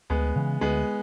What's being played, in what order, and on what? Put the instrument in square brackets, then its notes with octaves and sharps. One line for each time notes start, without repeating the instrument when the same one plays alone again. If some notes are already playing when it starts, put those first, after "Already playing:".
[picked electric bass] D2 [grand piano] G#3 B3
[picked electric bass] C#3 E3
[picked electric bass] D2 [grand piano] G#3 B3